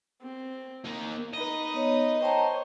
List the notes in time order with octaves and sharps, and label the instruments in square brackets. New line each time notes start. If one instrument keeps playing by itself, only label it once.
[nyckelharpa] C4
[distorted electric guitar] A#3 D#4
[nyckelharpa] D#4 B4 [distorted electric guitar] D#5
[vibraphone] B3 C#5
[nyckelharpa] C5 C#5 [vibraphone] G5 A5 A#5